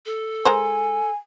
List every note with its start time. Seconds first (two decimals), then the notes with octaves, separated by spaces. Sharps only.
0.06 A4
0.45 G#3 A#4 C5 G#5